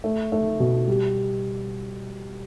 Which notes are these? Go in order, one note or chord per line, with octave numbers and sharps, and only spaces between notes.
A3
A3
B2
G3